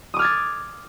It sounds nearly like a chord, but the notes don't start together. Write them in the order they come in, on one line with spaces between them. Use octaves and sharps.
D#6 D6 F6 G#6 A6